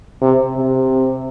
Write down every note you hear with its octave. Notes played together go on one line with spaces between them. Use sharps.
C3
C3